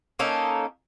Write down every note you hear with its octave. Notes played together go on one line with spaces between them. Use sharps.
A#3 C#4 D#4 A4